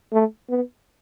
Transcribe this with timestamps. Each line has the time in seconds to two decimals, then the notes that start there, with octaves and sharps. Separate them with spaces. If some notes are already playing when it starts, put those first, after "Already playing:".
0.12 A3
0.50 B3